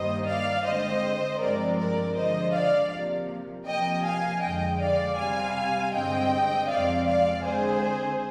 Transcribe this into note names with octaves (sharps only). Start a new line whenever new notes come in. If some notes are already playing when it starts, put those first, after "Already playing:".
Already playing: G2 D#3 G3 A#3 C5 D#5
D5 F5
D3 G#3 C4 C5 D#5
G2 F3 G#3 C4 A#4 D5
A#4 D5
D3 F3 G#3 C5 D#5
D5 F5
C3 F3 A#3
C3 F3 A#3 D#5 G5
F5 G#5
F2 D3 G#3 D#5 G5
D5 F5
C3 G3 C4 F5 G#5
G2 D3 G#3 C4 D#5 G5
F2 C3 F3 G#3 C4 D5 F5
D5 F5
D3 G#3 C4 G#4 C5